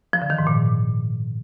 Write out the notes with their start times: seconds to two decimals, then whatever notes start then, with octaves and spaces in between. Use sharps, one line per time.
0.13 F3
0.22 D3
0.30 D#3
0.38 G#2
0.47 A#2